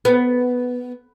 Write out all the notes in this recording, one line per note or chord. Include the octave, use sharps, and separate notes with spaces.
B3